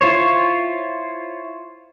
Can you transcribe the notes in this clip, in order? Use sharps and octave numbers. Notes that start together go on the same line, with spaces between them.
E4 F4 C5 C#5